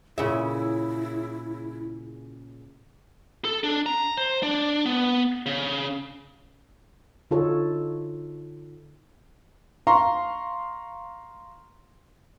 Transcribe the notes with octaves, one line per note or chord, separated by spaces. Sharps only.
A#2 C#3 E4 E5
A4
D4
A#5
C5
D4
B3
C#3
D3 D#4 F4 F#4 A4 C#5
F5 A#5 C6 C#6